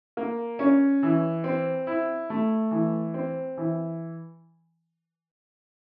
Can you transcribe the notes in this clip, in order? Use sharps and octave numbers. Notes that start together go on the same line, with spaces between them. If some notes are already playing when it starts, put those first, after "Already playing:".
A#3
C#4
E3
C4
E4
A3
E3
C4
E3